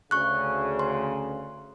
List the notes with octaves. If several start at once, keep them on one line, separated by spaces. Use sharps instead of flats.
D2 C#3 C#6 F#6
C6